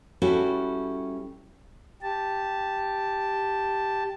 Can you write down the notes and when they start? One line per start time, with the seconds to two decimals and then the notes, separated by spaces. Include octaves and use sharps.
0.22 G3 C#4 E4 F#4 A4
2.02 G4 A5